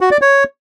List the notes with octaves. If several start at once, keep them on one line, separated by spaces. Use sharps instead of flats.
F#4
D5
C#5